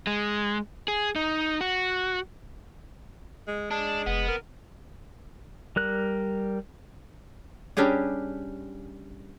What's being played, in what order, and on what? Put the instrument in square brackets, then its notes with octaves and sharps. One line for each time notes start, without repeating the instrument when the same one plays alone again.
[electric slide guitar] G#3
G#4
D#4
F#4
[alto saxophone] G#3
[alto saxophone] G#3 [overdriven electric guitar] D4
[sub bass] F1 [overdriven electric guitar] B3
[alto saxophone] A#4
[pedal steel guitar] G3 A#4 F#6
[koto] G3 C#4 D4 G4 G#4